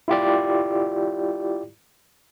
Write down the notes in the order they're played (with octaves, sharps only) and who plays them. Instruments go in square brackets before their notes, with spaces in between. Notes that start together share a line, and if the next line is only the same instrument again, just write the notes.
[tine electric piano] E4 F4 G4 D5